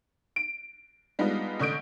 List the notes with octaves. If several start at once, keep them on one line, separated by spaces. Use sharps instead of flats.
D7
G3 G#3 B3 D4 D#4 F4
A1 D3 C#6 D#6 G6 D7